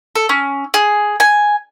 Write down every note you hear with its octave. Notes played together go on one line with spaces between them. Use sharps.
A4
C#4
G#4
G#5